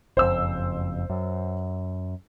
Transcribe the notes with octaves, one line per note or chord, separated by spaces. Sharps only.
F#1 F2 C5 E6
F#2